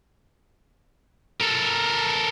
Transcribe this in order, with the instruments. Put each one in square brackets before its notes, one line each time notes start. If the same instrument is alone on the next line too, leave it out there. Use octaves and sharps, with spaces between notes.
[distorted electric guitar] A4 A#4